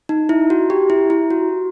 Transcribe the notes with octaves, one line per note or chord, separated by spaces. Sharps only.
D#4
E4
F#4
G4
E4
E4
F#4